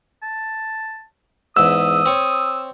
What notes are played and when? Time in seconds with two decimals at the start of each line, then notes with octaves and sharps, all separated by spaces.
0.23 A5
1.57 E2 G#2 D#6 E6
2.06 C4 C#5